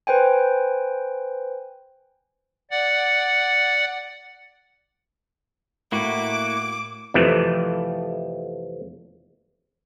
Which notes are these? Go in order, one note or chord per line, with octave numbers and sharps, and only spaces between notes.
B4 C5 G5 G#5
D5 F#5
A2 A#3 E4 F#4 D6
F2 C3 E3 F3 A3